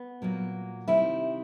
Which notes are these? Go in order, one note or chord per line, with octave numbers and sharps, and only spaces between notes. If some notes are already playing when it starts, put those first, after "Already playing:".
Already playing: B3
A#2 F#3 A#3
C3 D#3 G3 E4 E5